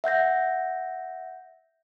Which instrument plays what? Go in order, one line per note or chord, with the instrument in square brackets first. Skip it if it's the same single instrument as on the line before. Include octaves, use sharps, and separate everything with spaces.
[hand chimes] E5 F#5 G6 A#6